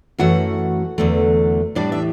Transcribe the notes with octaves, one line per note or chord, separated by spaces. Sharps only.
F#2 E3 A3 F#4 F#5
E2 D3 F#3 A3
A2 E3 G3 D4 D5
E5